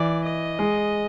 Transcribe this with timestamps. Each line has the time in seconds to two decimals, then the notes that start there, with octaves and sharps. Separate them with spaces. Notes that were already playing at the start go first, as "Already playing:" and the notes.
Already playing: E3 D5
0.24 D#5
0.59 G#3